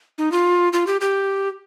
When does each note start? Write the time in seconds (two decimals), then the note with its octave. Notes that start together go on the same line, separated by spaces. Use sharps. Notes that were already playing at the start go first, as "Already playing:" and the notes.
0.18 D#4
0.32 F4
0.73 F4
0.87 G4
1.01 G4